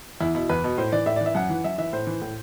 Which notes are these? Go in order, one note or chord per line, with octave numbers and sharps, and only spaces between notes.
E2 E4
B2 E4
E2 B4
B2
A2 C5
E3 D5
A2 E5
E3 D5
E5
F#2 F#5
E3
F#2 E5
E3 E5
A2 C5
E3
A2